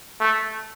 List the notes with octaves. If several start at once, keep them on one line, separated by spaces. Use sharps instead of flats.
A3